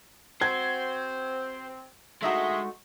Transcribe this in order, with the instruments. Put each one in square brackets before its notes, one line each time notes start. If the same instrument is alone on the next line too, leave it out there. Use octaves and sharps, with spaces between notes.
[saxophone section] C4 [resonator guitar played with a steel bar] F#4 [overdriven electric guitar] C5 [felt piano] G#6
[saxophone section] D2 D#5 E5 [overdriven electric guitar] G#3 [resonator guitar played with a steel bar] A3 D#4 F#4